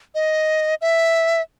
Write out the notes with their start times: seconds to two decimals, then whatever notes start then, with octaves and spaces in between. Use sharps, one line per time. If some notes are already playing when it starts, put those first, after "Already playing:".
0.15 D#5
0.81 E5